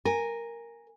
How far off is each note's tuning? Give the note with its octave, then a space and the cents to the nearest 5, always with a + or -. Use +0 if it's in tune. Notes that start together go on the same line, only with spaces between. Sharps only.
A#4 +0 G#5 -10